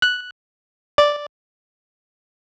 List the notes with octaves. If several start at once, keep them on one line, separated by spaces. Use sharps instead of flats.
F#6
D5